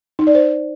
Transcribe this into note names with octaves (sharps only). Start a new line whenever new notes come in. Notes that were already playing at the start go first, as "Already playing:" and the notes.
D#4
D5
C5